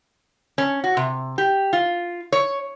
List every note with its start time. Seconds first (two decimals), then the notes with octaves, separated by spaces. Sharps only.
0.58 C#4
0.84 F#4
0.97 C3
1.38 G4
1.73 F4
2.32 C#5